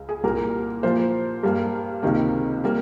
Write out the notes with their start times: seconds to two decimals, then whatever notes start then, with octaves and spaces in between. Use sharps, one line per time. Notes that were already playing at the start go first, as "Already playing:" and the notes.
Already playing: C#2 G#3
0.09 G#4
0.24 C2 A#2 G3 A#3 A#4
0.83 A#2 F3 A#3 C5
1.43 G2 G3 A#3
2.03 C#2 C3 D#3 A#3
2.64 G3 A#3